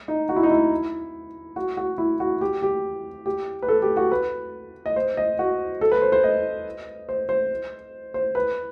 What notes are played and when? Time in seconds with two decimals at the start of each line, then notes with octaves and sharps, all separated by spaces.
0.08 D#4
0.29 F#4
0.36 E4
0.43 D#4
0.51 E4
1.56 F#4
1.77 F#4
1.98 E4
2.20 F#4
2.41 G4
2.62 G4
3.26 G4
3.62 B4
3.68 A4
3.82 G4
3.97 F#4
4.12 B4
4.86 D#5
4.96 C5
5.17 D#5
5.39 F#4
5.81 A4
5.92 B4
6.02 C5
6.12 C5
6.24 D#5
7.09 C5
7.29 C5
8.14 C5
8.35 B4